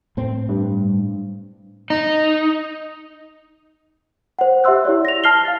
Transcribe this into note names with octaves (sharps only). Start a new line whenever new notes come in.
A2 C4
G2
D#4
C5 F#5
G4 E5 F#5 C6 E6 F#6
E4 G4 C#5 D5 E5
A#6 F7
A5 F6 C7 G7
F5 A6